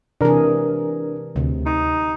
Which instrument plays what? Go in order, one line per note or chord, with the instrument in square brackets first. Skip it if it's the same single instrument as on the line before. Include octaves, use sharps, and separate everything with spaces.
[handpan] C3 E3 G#4 [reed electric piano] D4 A#4
[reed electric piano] D2 [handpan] C3
[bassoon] D#4